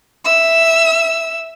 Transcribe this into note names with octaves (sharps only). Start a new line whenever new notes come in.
E5 E6